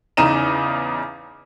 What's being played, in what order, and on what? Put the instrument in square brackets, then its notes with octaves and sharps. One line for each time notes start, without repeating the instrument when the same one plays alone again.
[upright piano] E2 C#3 D#4 A#5 D#7 E7